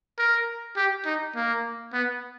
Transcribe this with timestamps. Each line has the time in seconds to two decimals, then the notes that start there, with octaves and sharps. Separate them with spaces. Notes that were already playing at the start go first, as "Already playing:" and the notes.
0.18 A#4
0.76 G4
1.06 D#4
1.35 A#3
1.93 B3